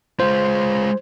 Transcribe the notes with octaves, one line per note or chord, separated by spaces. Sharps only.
G#3 F4 C5